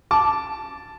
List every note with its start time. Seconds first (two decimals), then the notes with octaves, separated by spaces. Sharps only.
0.11 A5 D6